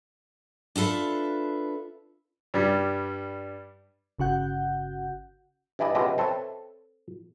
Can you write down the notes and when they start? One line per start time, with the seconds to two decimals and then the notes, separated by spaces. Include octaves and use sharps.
0.76 D4 F4 A4 B4 E5
2.54 G2 G3
4.19 G1 C#3 F#4 F#5 G6
5.79 G2 E3 E4 D5 D#5
5.95 C#2 B2 G#3 G4 D#5 E5
6.18 C4 A4 B4 C#5 E5